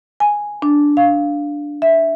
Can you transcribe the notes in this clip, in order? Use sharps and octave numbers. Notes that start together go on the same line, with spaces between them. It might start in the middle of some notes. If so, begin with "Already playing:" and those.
G#5
D4
F5
E5